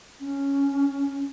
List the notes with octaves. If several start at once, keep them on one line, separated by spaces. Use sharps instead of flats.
C#4